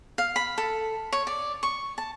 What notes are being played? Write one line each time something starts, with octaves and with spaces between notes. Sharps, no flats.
F5
B5
A4
C#5
D5
C#6
A5